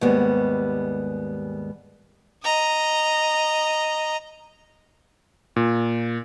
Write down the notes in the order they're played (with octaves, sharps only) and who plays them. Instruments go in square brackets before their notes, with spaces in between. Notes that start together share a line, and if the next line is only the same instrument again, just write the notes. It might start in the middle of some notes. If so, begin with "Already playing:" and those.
[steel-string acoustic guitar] D#2 G#2 G3 G#3 B3
[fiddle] D#5 A#5
[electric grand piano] A#2